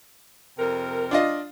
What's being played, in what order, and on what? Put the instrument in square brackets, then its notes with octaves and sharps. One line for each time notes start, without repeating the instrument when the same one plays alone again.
[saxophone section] F2 C3 A#4
[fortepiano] D4 F4 D#5